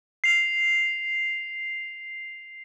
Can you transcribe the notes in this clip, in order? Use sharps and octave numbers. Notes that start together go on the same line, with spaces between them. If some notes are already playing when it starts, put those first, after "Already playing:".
C7 F7